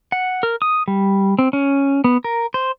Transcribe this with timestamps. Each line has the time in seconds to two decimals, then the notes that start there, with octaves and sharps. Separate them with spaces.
0.12 F#5
0.43 A#4
0.62 D#6
0.88 G3
1.39 C4
1.53 C#4
2.04 B3
2.24 A#4
2.54 C5